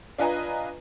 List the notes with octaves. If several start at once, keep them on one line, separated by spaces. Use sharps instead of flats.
D4 F4 B4 D#5 G#5 A#5